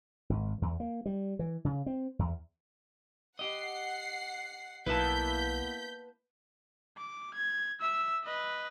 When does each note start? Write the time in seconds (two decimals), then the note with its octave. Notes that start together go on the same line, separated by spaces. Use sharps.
0.30 G#1
0.62 E2
0.80 A#3
1.06 G3
1.39 E3
1.65 C#3
1.86 C4
2.19 E2
3.39 G4 D#5 F#5 C7
4.86 B1 A#3 B3 E4 B4 A5 G6 B6
6.98 D6
7.35 G#6
7.80 E5 E6
8.24 B4 D#5